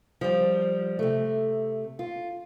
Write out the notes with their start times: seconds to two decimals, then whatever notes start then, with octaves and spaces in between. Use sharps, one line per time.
0.21 F3 G3
0.99 C3 A3
1.99 F4